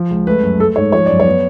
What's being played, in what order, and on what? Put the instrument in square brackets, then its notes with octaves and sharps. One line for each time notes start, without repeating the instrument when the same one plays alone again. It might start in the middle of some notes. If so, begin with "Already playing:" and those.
Already playing: [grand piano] F3
C#2
A3 B4
F#2
A3 A4
G#2 C#5
F3 C#5
F#2 D5
C#5
B3